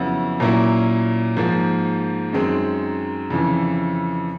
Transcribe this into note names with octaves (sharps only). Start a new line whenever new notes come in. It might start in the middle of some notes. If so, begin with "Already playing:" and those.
Already playing: F2 C#3 F#3 B3 E4
A#2 F#3 A#3 C#4 E4
G#2 F3 A#3
F#2 D#3 G#3 C4
F2 C#3 E3